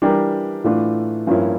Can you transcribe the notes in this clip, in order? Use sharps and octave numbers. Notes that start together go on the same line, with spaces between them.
E3 G3 D4 G4 A#4
A2 E3 A3 D4 F4
G2 F3 A#3 C#4 E4